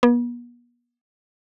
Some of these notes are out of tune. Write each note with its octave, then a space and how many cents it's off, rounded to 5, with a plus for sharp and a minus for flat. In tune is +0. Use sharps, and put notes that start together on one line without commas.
B3 -40